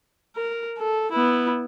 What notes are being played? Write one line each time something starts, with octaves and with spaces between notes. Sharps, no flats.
A#4
A4
B3 E4